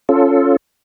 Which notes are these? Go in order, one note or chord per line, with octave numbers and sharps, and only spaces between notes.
C#4 F4 A4